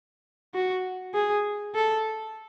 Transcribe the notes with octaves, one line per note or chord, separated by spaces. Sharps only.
F#4
G#4
A4